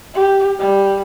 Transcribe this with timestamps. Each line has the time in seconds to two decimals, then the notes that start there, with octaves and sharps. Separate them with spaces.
0.14 G4
0.59 G3